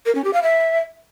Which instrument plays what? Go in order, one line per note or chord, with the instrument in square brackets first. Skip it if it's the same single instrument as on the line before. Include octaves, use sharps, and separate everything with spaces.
[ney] A#4
C#4
G4
F5
E5